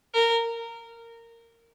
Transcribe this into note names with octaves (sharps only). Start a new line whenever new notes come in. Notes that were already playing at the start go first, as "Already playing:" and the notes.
A#4